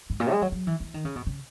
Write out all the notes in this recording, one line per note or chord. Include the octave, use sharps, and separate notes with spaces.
G#2
A#2
G#3
F#3
F#3
E3
E3
D#3
C#3
B2
C#3